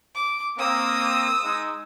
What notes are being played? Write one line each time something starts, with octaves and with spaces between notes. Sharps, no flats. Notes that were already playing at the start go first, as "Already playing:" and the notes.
D6
A#3 C4 D#6 E6
G#3 D#4